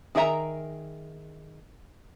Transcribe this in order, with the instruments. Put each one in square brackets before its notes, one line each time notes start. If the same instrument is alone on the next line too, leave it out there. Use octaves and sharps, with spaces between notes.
[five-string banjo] D#3 G#4 A#4 E5 A#5